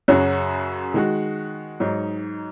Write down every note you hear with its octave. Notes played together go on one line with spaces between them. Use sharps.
F#2 C#3 F#3 C#4 F#4
D#3 G#3 F#4
G#2 F#3 D#4